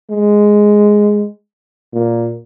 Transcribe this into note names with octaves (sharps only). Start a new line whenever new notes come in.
G#3
A#2